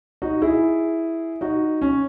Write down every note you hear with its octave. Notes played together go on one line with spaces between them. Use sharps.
D#4 F#4
E4 G#4
D#4 F#4
C#4